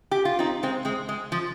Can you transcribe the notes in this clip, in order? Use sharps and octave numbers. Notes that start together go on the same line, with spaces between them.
G4
F4
C4 D#4
G#3 C4
G#3 C4
G#3
F3